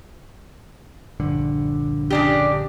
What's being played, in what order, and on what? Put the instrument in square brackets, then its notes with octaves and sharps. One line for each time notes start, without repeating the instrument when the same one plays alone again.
[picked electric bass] A#1 G2 D3
[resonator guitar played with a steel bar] C#3 D4 G4